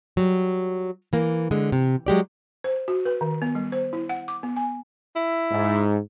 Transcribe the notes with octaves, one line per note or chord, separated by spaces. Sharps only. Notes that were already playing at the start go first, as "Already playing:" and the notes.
F#3 G3
E3 A#3
D3 G#3
C3
F#3 G#3 G4 D5
C5
F#4
B4
D#3
B3
G3
C5
E4
F#5
D6
B3
G#5
E4
G#2